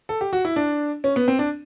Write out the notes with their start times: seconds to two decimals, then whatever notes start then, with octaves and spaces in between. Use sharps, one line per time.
0.09 A4
0.21 G4
0.33 F#4
0.45 E4
0.56 D4
1.04 C#4
1.16 B3
1.28 C4
1.39 D4